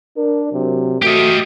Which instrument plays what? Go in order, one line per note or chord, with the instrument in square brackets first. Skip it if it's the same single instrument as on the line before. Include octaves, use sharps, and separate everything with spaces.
[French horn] D4 [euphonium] A#4
[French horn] C3 [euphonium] F#3
[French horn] A3 [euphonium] F#4 [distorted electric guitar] G4 D#5